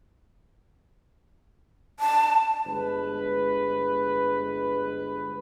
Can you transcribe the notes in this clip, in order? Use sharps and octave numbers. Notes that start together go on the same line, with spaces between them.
A5
G1 G#3 B4